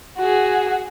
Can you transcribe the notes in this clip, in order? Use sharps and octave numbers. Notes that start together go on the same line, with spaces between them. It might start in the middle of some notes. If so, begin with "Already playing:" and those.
F#4 G#4